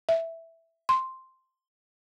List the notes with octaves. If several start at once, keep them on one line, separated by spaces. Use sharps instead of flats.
E5
C6